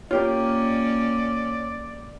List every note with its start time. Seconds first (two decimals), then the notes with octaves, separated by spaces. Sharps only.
0.11 A#3 C#4 F4 G4 A#4 C#5 D5